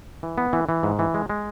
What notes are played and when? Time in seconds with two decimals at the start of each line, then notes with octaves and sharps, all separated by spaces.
0.23 E3
0.38 B3
0.53 E3
0.69 E3
0.83 G#2
0.99 E3
1.14 G#3
1.29 G#3